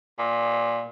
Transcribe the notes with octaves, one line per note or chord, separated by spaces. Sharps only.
A#2